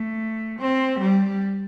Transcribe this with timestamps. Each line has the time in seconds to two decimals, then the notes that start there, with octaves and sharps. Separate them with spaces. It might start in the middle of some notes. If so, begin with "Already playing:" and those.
Already playing: A3
0.60 C4
1.00 G3